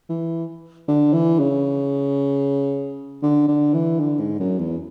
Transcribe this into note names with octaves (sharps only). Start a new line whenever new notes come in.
E3
D3
E3
C#3
D3
D3
E3
D3
G#2
F#2
E2